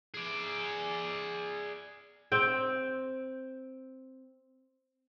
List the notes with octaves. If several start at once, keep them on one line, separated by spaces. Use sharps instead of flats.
G#4 D5
C4 G5